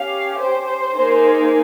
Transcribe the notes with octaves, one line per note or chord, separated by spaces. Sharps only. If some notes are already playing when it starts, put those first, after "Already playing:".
Already playing: C#4 G4 F5
C5
A#3 D#4 G#4